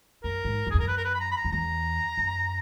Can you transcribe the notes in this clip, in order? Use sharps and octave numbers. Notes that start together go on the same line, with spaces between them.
F#2 A#4
G#2
F#2
E2 G#4
F#2 A#4
B4
A#4
B4
B5
A#5
B5
A#5
F#2
E2 A#5
F#2